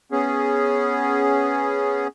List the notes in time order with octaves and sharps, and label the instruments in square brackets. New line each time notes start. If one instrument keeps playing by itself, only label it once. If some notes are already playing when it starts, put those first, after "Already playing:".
[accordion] B3 C#4 G#4